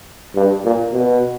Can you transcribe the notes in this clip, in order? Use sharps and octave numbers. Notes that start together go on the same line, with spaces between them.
G2
A#2
B2